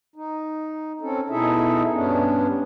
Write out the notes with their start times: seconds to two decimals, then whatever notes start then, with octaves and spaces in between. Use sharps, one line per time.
0.16 D#4
1.01 C4 C#4 A4
1.29 B2 D#4 E4 G#4 A4 E5
1.93 G2 B3 C#4 D4